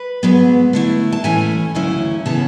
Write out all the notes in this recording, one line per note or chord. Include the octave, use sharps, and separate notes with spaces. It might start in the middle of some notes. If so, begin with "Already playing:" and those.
Already playing: B4
G#2 F#3 B3
D3 A3 E4
A5
A2 E3 A3 C#4 G#5
D2 C#3 F#3 C#4 E4
C#3 E3 B3 A5